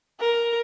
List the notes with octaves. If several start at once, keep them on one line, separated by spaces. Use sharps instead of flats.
A#4